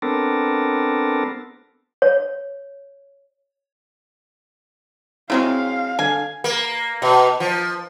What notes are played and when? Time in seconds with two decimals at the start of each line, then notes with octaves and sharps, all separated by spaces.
0.02 B3 C4 D4 A4 A#4
2.02 C#5
5.30 C#3 F#3 G#3 C4 E4 F5
5.99 D3 G#5
6.44 A#3
7.02 B2
7.40 F3